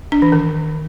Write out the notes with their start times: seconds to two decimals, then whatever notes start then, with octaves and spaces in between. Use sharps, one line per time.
0.12 D4
0.22 E3
0.32 D#3